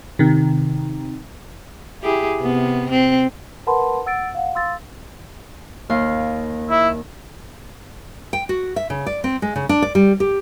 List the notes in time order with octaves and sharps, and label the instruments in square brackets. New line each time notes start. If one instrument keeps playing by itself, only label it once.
[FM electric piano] C3 D#3
[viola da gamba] E4 G4 G#4
C3 B3
C4
[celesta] A#4 B4 F#5 A5 B5 C6
F#5 E6 A6 D7
F5 F#5
F5 C6 E6 A6
[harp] D#2 F5
[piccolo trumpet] E4
[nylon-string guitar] G5
F#4
E5
C#3
D5
C4
G#3
C#3
D4
D5
G3
G4